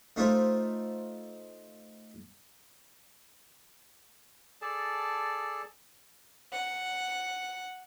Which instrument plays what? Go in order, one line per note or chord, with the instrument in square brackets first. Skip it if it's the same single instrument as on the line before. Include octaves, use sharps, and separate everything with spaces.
[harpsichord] A3 D#4 F4 C5 E5
[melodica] G#4 A4 D5 A5
[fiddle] F#5